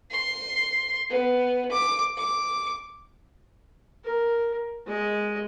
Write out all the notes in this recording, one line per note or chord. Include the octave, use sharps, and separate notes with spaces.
C6
B3
D6
D6
A#4
G#3 D#5